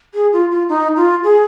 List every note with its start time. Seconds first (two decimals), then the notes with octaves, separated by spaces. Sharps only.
0.14 G#4
0.33 F4
0.51 F4
0.69 D#4
0.96 F4
1.24 G#4